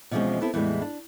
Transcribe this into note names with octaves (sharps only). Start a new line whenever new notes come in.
B2 E3 F3 G#3 C4 C#4
B3 C4 E4 A4
E2 A2 E3 F3 G3 G#3
D4